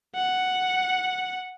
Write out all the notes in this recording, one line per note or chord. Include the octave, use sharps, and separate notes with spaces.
F#5